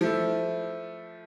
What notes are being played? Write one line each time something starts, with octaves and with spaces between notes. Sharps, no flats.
F3 A3 E4